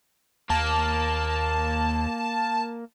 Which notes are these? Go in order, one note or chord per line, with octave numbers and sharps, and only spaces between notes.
D#2 A#3 A5